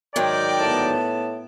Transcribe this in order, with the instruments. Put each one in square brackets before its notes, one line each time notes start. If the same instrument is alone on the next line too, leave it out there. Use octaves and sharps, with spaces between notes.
[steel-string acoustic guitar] G#2 D#3 F#3 [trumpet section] A#4 D5 G5
[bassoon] A2 [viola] B3 A5